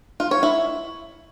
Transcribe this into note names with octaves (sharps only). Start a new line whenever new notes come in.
F4
C#5
E4